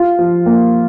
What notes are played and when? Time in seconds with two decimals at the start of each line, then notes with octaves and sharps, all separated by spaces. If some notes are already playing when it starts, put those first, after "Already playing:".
Already playing: F4
0.19 F3
0.46 A#3